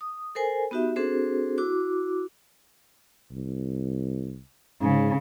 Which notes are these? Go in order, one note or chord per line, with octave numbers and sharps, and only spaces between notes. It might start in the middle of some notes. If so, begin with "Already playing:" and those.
D#6
A4 A#4 C5 G#5
B3 D#4 F#4 G4 E5
C4 D4 F#4 G#4 A4 C5
E4 F#4 D6
C2
G#2 C#3